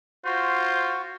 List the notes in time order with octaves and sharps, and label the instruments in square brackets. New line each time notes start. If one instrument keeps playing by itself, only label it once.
[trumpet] F4 [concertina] F#4 [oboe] C5